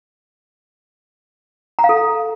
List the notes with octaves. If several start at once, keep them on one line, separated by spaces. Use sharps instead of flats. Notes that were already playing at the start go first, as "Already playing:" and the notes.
A#5
F5
A4